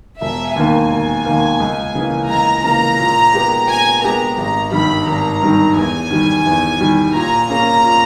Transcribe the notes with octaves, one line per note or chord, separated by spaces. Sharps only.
E1 E5
D#2 D#3 A#3 G#5
E1
D#2 D#3 A#3
C#2
C#3 E3 A#3
C#2 A#5
C#3 E3 A#3 A#5
A#2
G#3 B3 G4 A#4
A#2 G#5
G#3 B3 G4 A#4 A#5
G#1 A#5
G2 D#3 G3 B5
G#1 A#5
G2 D#3 G3
E2 G#5
D#3 G3
E2
D#3 G3
A#2 A#5
A#3 C#4 G#4
A#2